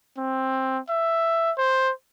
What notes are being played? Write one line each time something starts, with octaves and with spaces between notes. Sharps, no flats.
C4
E5
C5